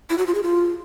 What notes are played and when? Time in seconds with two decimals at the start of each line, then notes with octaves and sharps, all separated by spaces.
0.10 E4
0.18 F#4
0.26 F4
0.35 G#4
0.43 F4